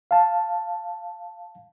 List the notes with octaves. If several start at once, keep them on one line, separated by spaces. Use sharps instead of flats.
F5 A5